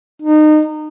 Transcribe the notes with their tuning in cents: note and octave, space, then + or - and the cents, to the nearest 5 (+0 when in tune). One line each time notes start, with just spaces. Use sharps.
D#4 -25